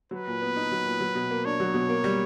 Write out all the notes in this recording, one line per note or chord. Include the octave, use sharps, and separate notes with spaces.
F#3 B4
A#2
B3
D#4
F#3
A#2
F#3
B2
A#3
D4 C#5
F#3
B2
A#3
G3